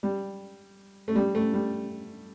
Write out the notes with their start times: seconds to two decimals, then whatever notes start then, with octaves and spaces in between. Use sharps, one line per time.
0.03 G3
1.08 A3
1.15 G3
1.35 A3
1.54 G3